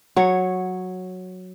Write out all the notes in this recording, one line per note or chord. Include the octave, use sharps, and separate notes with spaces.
F#3 C#5